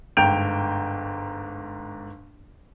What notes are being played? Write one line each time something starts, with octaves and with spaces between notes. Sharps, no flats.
G1 G#2 G5 G6 D7 F7